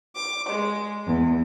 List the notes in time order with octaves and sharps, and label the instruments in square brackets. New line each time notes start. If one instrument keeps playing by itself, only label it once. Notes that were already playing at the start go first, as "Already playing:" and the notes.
[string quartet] D6
G#3
E2